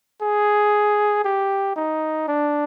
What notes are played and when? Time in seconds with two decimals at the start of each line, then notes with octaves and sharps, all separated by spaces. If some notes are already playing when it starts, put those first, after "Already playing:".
0.22 G#4
1.25 G4
1.76 D#4
2.28 D4